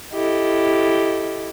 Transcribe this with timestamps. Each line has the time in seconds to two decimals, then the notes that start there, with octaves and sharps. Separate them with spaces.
0.13 E4 G4 A4 D#5